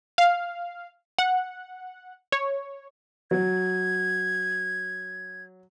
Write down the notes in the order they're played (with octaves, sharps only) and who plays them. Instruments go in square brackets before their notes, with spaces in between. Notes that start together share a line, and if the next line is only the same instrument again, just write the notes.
[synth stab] F5
F#5
C#5
[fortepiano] F#3 [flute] G#6